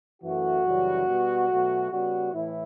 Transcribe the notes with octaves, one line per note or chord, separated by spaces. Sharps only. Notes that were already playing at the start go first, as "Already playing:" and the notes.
F#2 E3 A3 F#4
F#2 C#3 E3 G3
B2 G3 B3
B2 F#3 A3
C#3 G3 B3 F#4
A2 E3 A3 E4